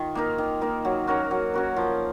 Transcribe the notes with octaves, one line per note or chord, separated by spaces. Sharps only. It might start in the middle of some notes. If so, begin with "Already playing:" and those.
Already playing: D#3 F4
A#3 D#4 A#4
D#3
A#3 D#4 A#4
F#3
C#4 F#4 A#4
F#3
C#4 F#4 A#4
F3